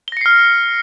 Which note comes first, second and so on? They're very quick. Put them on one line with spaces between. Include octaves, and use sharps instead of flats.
G7 A#6 C#7 C7 F6